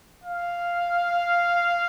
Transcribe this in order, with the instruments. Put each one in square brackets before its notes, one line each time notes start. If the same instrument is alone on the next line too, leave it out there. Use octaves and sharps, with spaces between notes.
[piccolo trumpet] F5